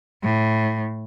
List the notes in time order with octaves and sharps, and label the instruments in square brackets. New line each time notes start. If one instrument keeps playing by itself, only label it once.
[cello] A2